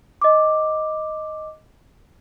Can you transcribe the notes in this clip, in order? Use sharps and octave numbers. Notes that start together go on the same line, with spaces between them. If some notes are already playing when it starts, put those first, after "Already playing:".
D#5 D6